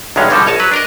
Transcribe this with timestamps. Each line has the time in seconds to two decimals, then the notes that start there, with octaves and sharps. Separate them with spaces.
0.16 B1 E2 G2 G#3 C#4 F5
0.30 B2 D3 F3 G3 G#3 A4
0.46 A#1 C#5 D#5 A5
0.60 F#3 B4
0.71 D4 A#4 D#5